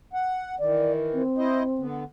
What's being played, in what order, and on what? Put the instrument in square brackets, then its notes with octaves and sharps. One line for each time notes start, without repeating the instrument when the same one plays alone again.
[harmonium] F#5
[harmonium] D#3 E3 [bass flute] D5
[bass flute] C4
[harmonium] E4 C5 D#5
D3 B3